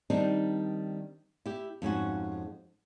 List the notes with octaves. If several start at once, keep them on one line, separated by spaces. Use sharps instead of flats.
D#3 G3 C4 D4 D#4
E4 G4
F2 G#2 C#4 F#4